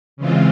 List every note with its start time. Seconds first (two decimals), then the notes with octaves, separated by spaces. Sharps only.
0.17 C#3 E3 G#3 C4 F4